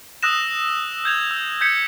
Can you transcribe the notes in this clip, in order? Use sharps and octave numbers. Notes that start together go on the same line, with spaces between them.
D#6 E6 F#6 A#6 E7
E6 G6 G#6 F7
E6
G6 G#6 B6 C#7